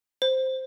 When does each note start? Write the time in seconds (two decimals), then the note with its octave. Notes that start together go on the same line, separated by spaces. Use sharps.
0.22 C5